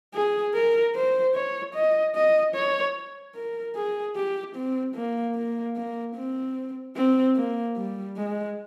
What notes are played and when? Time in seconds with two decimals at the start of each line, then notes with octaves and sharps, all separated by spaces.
0.14 G#4
0.54 A#4
0.95 C5
1.35 C#5
1.74 D#5
2.15 D#5
2.55 C#5
3.35 A#4
3.75 G#4
4.16 G4
4.55 C4
4.95 A#3
5.35 A#3
5.76 A#3
6.15 C4
6.96 C4
7.36 A#3
7.76 G3
8.16 G#3